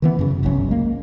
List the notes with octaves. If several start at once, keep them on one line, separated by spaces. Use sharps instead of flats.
D#3 E3 B3
F#2 C#3
G1 C2 F#3 C#4
G#3 A#3